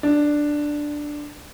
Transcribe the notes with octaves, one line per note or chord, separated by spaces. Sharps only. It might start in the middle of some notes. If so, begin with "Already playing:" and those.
D4